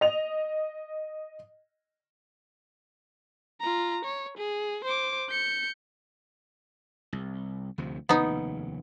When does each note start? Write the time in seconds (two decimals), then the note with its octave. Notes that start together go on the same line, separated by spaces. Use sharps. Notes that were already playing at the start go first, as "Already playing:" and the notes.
0.01 D#5 F7
3.60 F4 A#5
4.05 C#5
4.38 G#4
4.84 C5 D6
5.29 G6 C#7
7.13 C2
7.78 D2 C3 F3
8.09 F1 D#2 C#3 B3 D#4